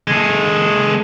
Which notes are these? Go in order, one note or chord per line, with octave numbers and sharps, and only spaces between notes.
G#3 A4